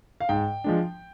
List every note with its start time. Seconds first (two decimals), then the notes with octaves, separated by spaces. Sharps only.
0.20 F5
0.29 G#2 G5
0.64 F3 G#3 D4